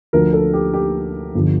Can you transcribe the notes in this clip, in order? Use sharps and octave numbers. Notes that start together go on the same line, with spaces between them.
D2 D3 F3 A#4
A4
G4
G4
G1 D3 F3